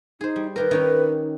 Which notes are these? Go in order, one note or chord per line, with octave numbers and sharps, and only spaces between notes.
D#4 G#4 C5
G3
D#3 G4 A#4 B4
D#3 C#4 D#4